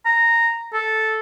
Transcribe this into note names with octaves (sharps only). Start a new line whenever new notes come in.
A#5
A4